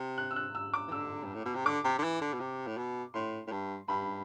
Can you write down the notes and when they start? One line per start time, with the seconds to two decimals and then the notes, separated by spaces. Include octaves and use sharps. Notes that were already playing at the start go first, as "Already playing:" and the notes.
Already playing: C3
0.18 F#6
0.31 E6
0.36 F#6
0.55 E6
0.74 D6
0.88 E3
0.92 D3 E6
1.24 G2
1.34 A2
1.45 B2
1.55 C3
1.66 D3 D6
1.85 C3
1.98 D3
2.03 E3
2.22 D3
2.33 B2
2.40 C3
2.67 A2
2.78 B2
3.14 A2 C6
3.47 A2
3.52 G2
3.88 G2 B5